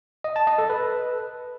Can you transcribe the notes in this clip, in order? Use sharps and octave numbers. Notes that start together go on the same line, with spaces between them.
D#5
A5
D#5
A4
B4